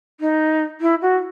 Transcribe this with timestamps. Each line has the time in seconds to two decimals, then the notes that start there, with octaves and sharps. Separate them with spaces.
0.20 D#4
0.81 E4
1.02 F#4